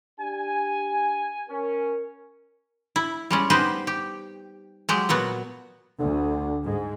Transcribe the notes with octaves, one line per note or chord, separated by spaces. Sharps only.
D4 G4 G#5
C#4 A#4
E4
G3 G#3 C#4
B3 D#4 G4 B4 C5
G4
F#3 G#3 G4
A#2 F#3 B3 F#4
D2 D3
G#2 G#3